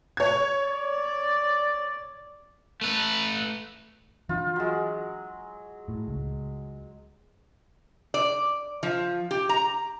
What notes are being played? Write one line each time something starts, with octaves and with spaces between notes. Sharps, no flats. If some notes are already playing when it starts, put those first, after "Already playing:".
C#5 G#6
D5
A3 B4
E3 D4 F4
F#3 G#3
A2
C#2
D5
F3
G4
A#5